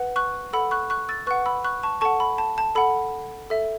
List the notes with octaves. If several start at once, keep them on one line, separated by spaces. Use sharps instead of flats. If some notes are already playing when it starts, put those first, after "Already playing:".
Already playing: B4 F#5
C#6 F#6
A4 F#5 B5 E6
C#6 F#6
C#6 F#6
E6 A6
B4 F#5 C#6 F#6
B5 E6
C#6 F#6
A5 C#6
A4 F#5 A5 C#6
B5
A5
A5
A4 F#5 B5
A4 E5